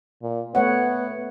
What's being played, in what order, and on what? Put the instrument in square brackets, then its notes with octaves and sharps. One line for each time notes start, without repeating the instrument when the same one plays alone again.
[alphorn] A#2
[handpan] A3 C#5 F#5 [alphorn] B3